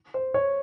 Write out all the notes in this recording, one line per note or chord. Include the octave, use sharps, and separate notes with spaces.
C5
C#5